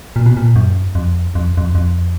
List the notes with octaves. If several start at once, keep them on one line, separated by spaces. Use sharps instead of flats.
A#2
B2
A#2
F#2
F2
F2
F2
F2